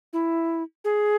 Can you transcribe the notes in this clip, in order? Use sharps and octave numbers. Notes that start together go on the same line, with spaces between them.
E4
G#4